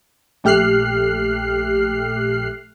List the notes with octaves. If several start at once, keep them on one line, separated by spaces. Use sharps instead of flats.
A#1 A3 G4 F6 F#6 C7